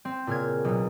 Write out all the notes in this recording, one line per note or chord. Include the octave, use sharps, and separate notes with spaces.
C4
A#2 C#3 F6 G#6
B1 B2